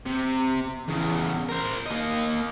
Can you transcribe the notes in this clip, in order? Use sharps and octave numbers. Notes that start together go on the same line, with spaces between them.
C3
E2 C#3
A#4 C5
A#3 D#5